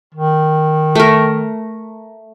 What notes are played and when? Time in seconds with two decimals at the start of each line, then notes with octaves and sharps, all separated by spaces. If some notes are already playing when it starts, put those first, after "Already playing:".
0.14 D#3
0.95 A3 A#4